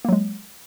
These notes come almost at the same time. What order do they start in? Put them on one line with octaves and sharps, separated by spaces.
A#3 F#3 G#3